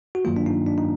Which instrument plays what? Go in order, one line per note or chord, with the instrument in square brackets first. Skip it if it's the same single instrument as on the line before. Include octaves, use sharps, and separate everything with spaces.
[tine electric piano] F#4
G2 D#3 F#3 A#3 F4
D4
D#4
D4
D#4